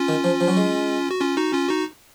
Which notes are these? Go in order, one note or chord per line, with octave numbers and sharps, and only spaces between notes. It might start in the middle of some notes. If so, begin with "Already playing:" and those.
Already playing: C#4 F4
D#3
F3
F3
F#3
G#3
F#4
C#4 F4
D#4 F#4
C#4 F4
D#4 F#4